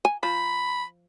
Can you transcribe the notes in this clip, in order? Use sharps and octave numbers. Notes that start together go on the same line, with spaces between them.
G#5
F3 B5